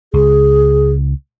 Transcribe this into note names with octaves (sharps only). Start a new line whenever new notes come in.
C#2 G#4